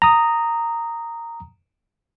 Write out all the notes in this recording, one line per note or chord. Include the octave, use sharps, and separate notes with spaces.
A#5 D#6